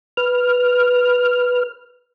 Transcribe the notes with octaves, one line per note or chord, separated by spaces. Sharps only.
B4 F6